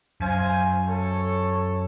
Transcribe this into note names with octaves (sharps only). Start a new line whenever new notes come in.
F#2 C5 F5 G#5
A4 C#5